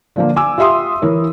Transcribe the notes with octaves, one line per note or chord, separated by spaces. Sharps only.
D3 F3 A#3
G#5 D6 E6
F4 G4 E5 C6 D#6
E3 A#4 C#5